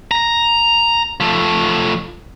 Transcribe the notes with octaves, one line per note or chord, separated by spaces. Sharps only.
A#5
F3 A3